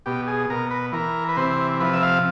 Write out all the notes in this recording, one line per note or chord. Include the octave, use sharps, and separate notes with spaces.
B2 G4
G#4
B2 A#4
B4
E3 A#4
B4
C3 C5
F3 B4
E5
F5